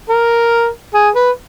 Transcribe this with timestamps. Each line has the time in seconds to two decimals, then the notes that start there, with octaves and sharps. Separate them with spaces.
0.10 A#4
0.94 G#4
1.15 B4